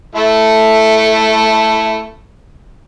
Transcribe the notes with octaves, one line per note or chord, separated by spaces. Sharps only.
A3 E4 A4